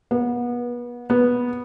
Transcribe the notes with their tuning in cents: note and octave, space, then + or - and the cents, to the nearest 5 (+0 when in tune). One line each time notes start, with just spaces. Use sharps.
B3 -30
B3 -10